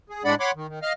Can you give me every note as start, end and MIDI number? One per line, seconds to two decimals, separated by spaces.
0.10 0.23 68
0.24 0.35 45
0.24 0.35 56
0.24 0.35 62
0.24 0.35 74
0.24 0.35 78
0.24 0.35 83
0.40 0.51 73
0.40 0.51 78
0.40 0.51 83
0.40 0.51 84
0.40 0.51 86
0.55 0.67 51
0.68 0.79 51
0.82 0.93 75
0.82 0.93 77
0.82 0.93 89